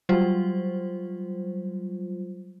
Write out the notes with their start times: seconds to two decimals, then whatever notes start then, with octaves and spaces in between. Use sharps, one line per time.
0.09 F#3 G3 F4 C5